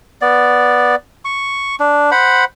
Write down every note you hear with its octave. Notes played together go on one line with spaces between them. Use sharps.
B3 D5
C#6
D4
C5 F#5 B5